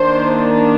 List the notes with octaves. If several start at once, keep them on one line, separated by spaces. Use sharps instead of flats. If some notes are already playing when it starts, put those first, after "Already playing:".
Already playing: D#3 A#3 D4 C5